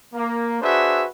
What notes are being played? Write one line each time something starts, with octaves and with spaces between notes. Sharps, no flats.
A#3
D4 F#4 G#4 B4 C5 E5